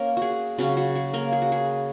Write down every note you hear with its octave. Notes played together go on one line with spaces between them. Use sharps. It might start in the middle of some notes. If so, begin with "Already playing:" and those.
Already playing: A#3 C#4 A#4
F#4 G#4
C#3 F#3 C#4 F#4
F#4
G#4
A#3 A#4
G#4
F#4
G#4